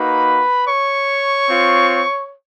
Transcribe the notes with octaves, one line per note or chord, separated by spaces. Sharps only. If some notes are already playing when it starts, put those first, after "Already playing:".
Already playing: A#3 D#4 F#4 B4 B5
C#5 C#6
C4 F4